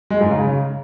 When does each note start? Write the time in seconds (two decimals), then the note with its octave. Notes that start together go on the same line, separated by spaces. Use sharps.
0.10 G#3
0.21 G#2
0.31 C#3